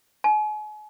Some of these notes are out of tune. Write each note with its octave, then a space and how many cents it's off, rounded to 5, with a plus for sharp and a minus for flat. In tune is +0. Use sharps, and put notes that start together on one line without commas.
G#5 +40